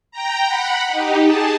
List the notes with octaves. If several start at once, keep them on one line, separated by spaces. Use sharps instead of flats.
G5 A#5
F#5 B5
D#4 G4
G#4 A5